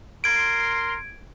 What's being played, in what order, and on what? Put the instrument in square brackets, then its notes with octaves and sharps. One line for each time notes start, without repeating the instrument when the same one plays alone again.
[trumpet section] A#4 C6 [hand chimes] G#6 D7